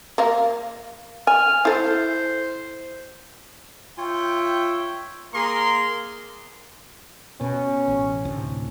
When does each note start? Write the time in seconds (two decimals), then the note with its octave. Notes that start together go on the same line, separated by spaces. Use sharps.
0.18 A#3 A#4 F5
1.27 G#5 F6
1.65 E4 A4 C5
3.98 F4 C#5 E5 G5
5.34 A#3 G#4 A#4 A#5 C6
7.41 B2 C#4
7.88 A1
8.25 D2 A2 C3